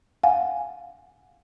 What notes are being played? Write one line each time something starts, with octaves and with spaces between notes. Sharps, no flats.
F5 F#5 G#5